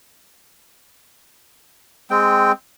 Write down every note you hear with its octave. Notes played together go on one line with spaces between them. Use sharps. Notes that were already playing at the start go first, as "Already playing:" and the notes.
G#3 C4 G5